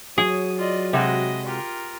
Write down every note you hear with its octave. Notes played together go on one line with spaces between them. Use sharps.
F#3 G#4 C#5 D#6
F4 D5 D#5
C3 G#3 F#4 D#5 B5
F4 G4 A#4